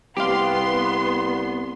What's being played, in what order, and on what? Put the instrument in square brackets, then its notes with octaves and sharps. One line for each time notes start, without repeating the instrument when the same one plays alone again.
[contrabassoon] C2 [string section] B3 C6 [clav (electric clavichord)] G4 F5